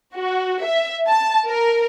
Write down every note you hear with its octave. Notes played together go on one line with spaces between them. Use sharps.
F#4
E5
A5
A#4